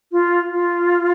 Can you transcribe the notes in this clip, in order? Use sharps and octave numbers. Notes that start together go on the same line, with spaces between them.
F4
F4